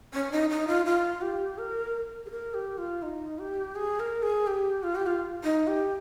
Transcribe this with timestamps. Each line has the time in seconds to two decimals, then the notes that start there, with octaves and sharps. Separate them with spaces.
0.14 C#4
0.32 D#4
0.50 D#4
0.68 F4
0.86 F4
1.22 G4
1.58 A#4
2.26 G#4
2.31 A#4
2.54 G4
2.78 F4
3.03 D#4
3.39 G4
3.75 G#4
4.00 A#4
4.23 G#4
4.47 G4
4.83 F4
4.95 G4
5.06 F4
5.44 D#4
5.67 G4